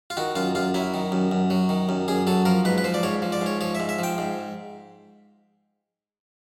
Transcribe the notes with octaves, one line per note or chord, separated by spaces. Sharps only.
F4
D#3 F#4
F#2 F4
F#2 F4
F#3 E4
D#3
F#2
F#2
F#3
D#3
F#2
F#2 G#4
F#3 A4
F3 A#4
G#2 B4
B4
F3 C5
D5
G#2 C#5
F3
D5
G#2 C#5
F3 C#5
E5
G#2
E5
F3 G5
G#2